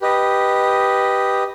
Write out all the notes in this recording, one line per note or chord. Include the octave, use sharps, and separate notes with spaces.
G4 B4 D#5